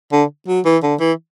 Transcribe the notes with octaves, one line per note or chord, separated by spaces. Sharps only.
D3
F#3
E3
D3
E3